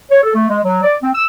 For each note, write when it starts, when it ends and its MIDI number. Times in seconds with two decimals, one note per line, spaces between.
0.10 0.19 73
0.23 0.30 69
0.34 0.48 57
0.49 0.59 56
0.64 0.81 54
0.82 0.95 74
1.02 1.09 60
1.14 1.24 88